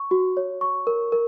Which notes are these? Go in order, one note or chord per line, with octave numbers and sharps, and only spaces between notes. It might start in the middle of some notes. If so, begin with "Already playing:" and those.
Already playing: C#6
F#4
C#5
C#6
A#4
A#4